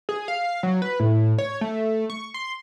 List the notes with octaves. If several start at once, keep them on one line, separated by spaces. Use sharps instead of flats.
G#4
F5
F#3
B4
A2
C#5
A3
C#6
C6